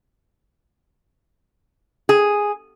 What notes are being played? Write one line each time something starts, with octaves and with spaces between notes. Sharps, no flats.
G#4